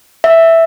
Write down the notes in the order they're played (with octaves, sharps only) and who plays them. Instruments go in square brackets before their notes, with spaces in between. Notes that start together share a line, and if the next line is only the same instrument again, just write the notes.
[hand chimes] E5